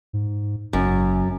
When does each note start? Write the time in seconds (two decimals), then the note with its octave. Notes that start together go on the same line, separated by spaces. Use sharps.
0.13 G#2
0.73 F#1 F#2